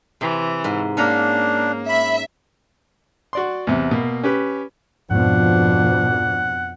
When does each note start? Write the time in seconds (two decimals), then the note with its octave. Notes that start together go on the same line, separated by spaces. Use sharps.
0.21 C3 E3
0.64 G#2
0.97 A#3 C#4 D4 F5 A#5
1.89 E5 B5
3.33 F#4 D5 C6
3.67 E2 C3
3.91 B2 A#3
4.23 C#4 G4 B4
5.11 F2 G#2 B2 F3 D4 F#5